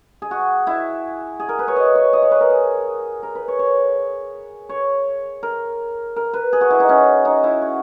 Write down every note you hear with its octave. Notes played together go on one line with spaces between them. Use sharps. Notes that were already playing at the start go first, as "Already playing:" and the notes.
G#4
F#4
E4
G#4
A#4
B4
C#5
D#5
C#5
D#5
C#5
B4
A#4
G#4
A#4
B4
C#5
C#5
C#5
A#4
A#4
B4
G#4
F#4
E4
D#4
C#4
D#4
E4
F#4